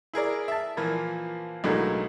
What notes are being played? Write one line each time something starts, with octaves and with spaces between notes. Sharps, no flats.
E4 G#4 A#4 D5
E5 A5
A#2 E3 F3 A#3
B1 A2 D3 F#3 G#3 A#3